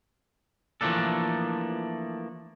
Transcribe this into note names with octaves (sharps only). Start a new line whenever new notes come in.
E3 F3 A3 A#3 D4 A4